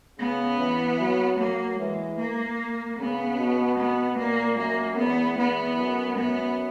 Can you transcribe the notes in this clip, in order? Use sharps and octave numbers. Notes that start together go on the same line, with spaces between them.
C#3 B3
E3
F#3
F#3 A#3
E3 G#3
A#3
C#3 B3
B2
B3
A#2 A#3
F#2 A#3
E2 B3
E2 B3
F#2
F#2 B3